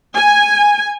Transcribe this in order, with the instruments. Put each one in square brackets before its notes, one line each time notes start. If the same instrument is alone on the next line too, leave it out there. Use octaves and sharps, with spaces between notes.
[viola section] G#5